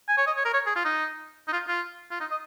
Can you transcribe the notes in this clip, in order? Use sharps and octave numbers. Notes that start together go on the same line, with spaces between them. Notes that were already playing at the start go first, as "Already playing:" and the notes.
G#5
C#5
D#5
C#5
A#4
C#5
G#4
F4
D#4
D#4
F4
F4
F4
D#4
D#5